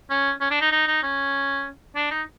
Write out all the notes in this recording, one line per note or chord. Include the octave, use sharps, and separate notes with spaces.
C#4
C#4
D4
D#4
D#4
D#4
C#4
D4
D#4